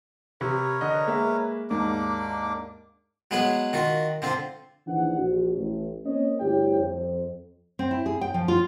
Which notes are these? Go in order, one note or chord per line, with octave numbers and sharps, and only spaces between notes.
C3 A#4 B4 C#5
D3 D#5
G#3 A#3 E5
D#2 G#2 A#3 D4 D6
F#3 G#3 B3 G#4 B4
D#3 F4 F#4
D3 C4 F4
A#1 D#3 E3 D4 F#5
A#1 F#4
A1
A#3 C4 C#4 C#5 D#5
D2 G2 E4 G4 C#5 G5
F2
C4
E4
G#4
G5
F3
F4